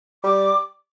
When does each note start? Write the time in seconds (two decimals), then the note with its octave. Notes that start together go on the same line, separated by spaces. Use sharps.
0.24 G3 D6